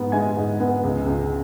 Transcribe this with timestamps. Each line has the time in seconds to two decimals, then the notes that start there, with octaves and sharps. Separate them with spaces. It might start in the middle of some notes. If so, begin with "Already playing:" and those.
Already playing: G#2 B3
0.12 G#3 G#5
0.36 G#2
0.60 B3
0.83 C#2
1.06 C#2